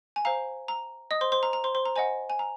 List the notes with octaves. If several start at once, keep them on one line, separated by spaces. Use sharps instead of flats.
G#5
C5 F5 A#5
A#5
D#5 D#6
C5 C6
C5 C6
A#5
A#5
C5 C6
C5 C6
A#5
C5 D#5 F#5 G#5
G#5
A#5